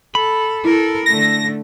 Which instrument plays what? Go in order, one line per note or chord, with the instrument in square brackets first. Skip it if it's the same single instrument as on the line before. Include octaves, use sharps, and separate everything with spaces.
[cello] A4 [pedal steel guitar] B5
[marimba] E4 [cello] A4 A#4
[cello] D3 A3 [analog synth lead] A#6